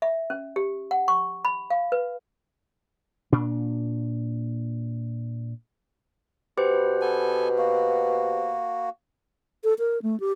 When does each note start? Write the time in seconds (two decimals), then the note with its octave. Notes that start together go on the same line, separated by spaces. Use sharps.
0.02 E5
0.30 C#4
0.56 G4
0.91 F#5
1.08 C#6
1.45 B5
1.70 F5
1.92 B4
3.32 A#2 D4
6.57 B2 G4 B4 C5
7.01 B3 A4 G#5
7.58 A#3 F#4
9.64 A4
9.79 A#4
10.02 A3
10.20 G4